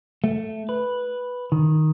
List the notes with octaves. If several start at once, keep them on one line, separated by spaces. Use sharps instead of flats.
A3
B4
D#3